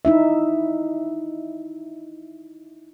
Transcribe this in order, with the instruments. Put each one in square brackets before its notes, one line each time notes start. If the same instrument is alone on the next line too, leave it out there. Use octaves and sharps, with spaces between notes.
[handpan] D#4 E4 E5